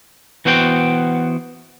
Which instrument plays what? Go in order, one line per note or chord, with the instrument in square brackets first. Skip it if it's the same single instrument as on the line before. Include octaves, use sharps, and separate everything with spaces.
[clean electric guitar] E3 B3 F#4 C5 G5